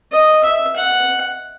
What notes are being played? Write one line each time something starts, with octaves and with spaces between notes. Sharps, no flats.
D#5
E5
F#5